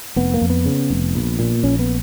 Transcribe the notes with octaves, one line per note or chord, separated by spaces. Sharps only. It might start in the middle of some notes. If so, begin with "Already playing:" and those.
F1 B3
A#3
F2
B3
C#3
F1
A#1
A#2
A#1 C#4
B3